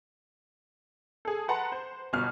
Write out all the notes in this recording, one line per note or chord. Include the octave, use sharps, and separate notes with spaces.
G#4 A4
B4 F#5 A5 A#5 C6
C5
G1 B2 F#4 F6